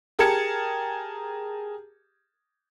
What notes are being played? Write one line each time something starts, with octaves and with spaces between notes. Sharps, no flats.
G4 G#4 A#4 A5 G#6 C#7